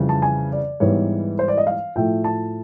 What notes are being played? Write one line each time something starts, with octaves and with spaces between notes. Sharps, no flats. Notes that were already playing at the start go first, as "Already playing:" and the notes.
Already playing: F2 C#3 E3 G3
A5
G#5
D5
G#2 E3 G3 B3 C#5
C5
D5
D#5
F5
A2 F3 A3 G5
A5